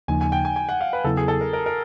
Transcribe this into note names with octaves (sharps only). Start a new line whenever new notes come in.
D#2 C#3 F3 A#3 D#4 G#5
G#5
G5
G#5
G#5
F#5
F5
B4
E2 C#3 F#3 B3 E4 A4
G#4
A4
A#4
A#4
A#4